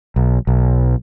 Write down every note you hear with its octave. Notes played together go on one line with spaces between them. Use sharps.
B1
B1